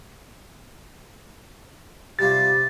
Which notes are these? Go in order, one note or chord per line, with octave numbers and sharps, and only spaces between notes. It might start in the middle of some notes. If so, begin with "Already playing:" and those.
C3 G3 F4 A6